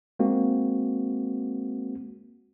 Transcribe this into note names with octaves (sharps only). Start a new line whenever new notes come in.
G#3 A#3 C4 F#4